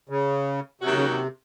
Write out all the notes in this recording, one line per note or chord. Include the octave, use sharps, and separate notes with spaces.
C#3
D#2 C3 D#3 F#3 C#4 F#4
C#3
C3